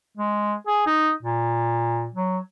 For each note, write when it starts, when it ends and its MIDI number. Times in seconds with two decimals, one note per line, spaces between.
0.18 0.55 56
0.67 0.85 68
0.86 1.11 63
1.23 2.09 46
2.15 2.38 54